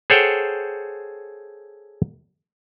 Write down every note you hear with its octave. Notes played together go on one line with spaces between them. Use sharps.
G#4 A4 C5 C#5 F#5 G5